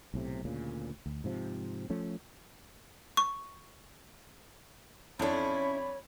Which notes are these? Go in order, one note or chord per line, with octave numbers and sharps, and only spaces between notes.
B1 A2 C3
D2 A#2 C#3
D2
G#2 C3 F3
F3 A3 C#4
C#6
F2 C#4 D4 E4 A4 C#5 B5